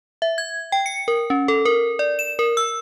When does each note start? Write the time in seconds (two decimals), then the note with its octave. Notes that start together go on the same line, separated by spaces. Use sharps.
0.22 E5
0.38 G#6
0.72 G5
0.86 C#7
1.08 A#4
1.30 C#4
1.48 A4
1.65 A#4
1.99 D5
2.19 E7
2.39 A#4
2.57 E6